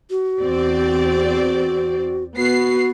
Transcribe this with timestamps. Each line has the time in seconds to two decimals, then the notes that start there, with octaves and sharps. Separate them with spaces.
0.10 F#4
0.40 E2 C4 D5
2.37 B3 F#4 C7